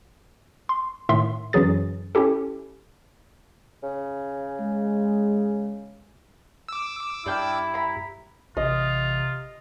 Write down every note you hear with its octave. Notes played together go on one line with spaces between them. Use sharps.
C6
A2 D#3 E5 C6
F#2 D3 E3 F#3 G#4 A6
C#4 E4 G4 A4
C#3
G#3
D6 E6
G2 D4 E4 G4 G5 F6
A#5 B5
A1 C3 F4 D#5